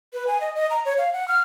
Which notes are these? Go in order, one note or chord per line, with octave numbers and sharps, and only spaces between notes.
B4
G#5
D#5
D#5
A#5
C#5
F5
F#5
F6